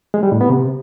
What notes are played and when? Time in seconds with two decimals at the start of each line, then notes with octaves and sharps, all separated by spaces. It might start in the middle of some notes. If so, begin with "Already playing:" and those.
0.14 G#3
0.23 G3
0.32 A2
0.41 B3
0.50 C3